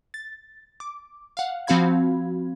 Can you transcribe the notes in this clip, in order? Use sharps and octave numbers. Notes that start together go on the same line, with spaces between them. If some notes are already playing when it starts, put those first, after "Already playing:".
A6
D6
F5 F#5
F3 C4 F#4 F5 B5 G#6